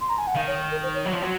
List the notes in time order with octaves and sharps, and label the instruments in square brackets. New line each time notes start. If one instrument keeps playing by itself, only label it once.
[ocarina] C6
A#5
G#5
F#5
[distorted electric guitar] D#3 [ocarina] F5
[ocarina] C#5
A#4
C5
C#5
[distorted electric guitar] F#3
F3
F#3